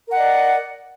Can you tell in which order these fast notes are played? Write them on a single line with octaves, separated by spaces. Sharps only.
A#4 F#5 D#5 D5